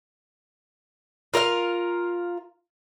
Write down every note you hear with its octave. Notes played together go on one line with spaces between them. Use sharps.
F4 A#4 C5 F5